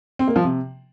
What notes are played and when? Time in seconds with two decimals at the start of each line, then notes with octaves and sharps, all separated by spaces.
0.19 C4
0.28 A#3
0.36 F3
0.44 C3